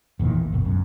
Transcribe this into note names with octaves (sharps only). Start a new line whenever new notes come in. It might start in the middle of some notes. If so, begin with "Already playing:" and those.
E1 A#2 D#3 E3
A1
D1 G1 B2
C#2 F#2